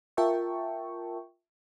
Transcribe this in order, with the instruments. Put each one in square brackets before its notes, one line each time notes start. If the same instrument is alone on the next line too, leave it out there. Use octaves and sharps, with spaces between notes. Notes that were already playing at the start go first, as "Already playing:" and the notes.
[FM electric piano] F4 A#4 E5 G5 A5 C#6